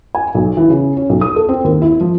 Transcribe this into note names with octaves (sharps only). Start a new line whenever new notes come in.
G#5
B1
E3
C#3
C#4
B1
D#6
A4
C4
D#2
E4
F3